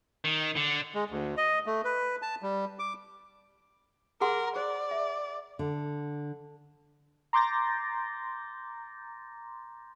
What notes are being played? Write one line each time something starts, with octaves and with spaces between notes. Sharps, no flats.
D#3
D3
G#3
D2
D#5
A3
B4
A5
G3
D6
G#4 A#4 F#5 C6
C5 D5
E5
D3
A#5 C6 D6 G6 A6 A#6